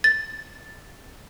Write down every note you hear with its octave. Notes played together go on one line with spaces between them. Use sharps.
A6